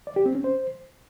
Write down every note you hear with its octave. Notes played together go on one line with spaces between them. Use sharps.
D5
G4
C4
C#4
C5